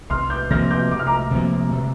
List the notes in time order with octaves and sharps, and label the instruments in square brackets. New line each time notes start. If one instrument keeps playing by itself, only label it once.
[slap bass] C2 [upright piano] C6 F6
[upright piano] D6 G6
[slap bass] C3 F3 A#3 [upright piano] F6 A#6
[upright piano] D6 G6
[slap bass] C2 [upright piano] D6
[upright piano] F6
A#5 D6
[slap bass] C3 F3 A#3
C3